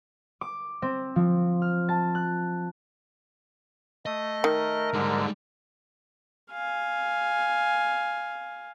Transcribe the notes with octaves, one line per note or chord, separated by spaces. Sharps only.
D6
C4
F3
F6
A5
F#6
A3 D#5
D#3 A#4
G#2 D3 G3 G#3
F5 G#5